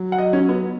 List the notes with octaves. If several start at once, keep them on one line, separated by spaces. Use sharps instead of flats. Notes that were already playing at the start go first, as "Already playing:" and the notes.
Already playing: F#3
F#5
D#5
C#4
B3